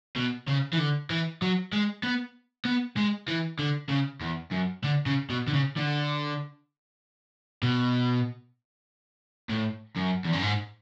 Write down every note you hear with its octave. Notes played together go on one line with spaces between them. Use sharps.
B2
C#3
E3
D3
E3
F#3
G#3
B3
B3
G#3
E3
D3
C#3
E2
F#2
D3
C#3
B2
D3
C#3
D3
B2
A2
F#2
E2
F#2
G#2